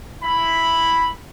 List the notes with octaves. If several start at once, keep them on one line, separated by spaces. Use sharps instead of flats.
E4 B5